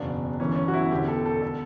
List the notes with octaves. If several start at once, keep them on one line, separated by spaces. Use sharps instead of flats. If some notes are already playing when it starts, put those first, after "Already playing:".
Already playing: F#1 E2 B2 D4
G1 F#2 E3 C#4
C#4
F#4
E4
E1 D2 D3 G4
A4
A4
D3 A4